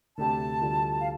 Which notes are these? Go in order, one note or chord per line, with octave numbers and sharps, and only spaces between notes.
D2 C3 A3 D4 G4 A5
D2 D3 G3 F4 A4
F5